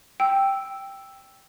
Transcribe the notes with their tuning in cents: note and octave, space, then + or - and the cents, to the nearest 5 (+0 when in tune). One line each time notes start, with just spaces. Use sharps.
G5 +0 E6 +0